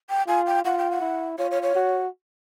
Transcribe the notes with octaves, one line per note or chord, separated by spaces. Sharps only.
G5
F4 G#5
G5
F4 F#5
G5
F#5
E4
F4 C#5
C#5
C#5
F#4